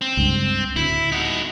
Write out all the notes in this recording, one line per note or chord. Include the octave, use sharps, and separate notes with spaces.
C4
C#2 G2
D2 A2 E4
D#4 F#4